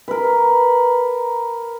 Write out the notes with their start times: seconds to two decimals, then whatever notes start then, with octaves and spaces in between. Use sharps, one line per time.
0.08 A#4 B4